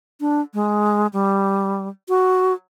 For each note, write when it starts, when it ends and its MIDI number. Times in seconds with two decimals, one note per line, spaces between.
0.21 0.41 62
0.54 1.07 56
1.13 1.88 55
2.09 2.53 66